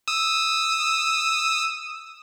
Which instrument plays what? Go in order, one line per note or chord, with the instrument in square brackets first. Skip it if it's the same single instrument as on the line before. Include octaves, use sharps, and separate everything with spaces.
[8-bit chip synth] D#6 E6